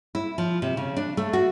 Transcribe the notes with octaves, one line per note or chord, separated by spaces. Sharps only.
E4
F3
C3
C#3
D4
A3
F#4